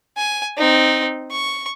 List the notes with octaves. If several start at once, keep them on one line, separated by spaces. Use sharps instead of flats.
G#5
C4 D#4
C#6